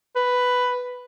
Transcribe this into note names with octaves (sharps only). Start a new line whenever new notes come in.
B4